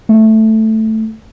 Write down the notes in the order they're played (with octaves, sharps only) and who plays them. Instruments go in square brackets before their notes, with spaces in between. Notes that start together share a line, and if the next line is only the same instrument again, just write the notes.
[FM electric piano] A3